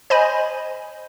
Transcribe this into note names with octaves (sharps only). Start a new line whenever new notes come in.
C5 D#5 G#5 B5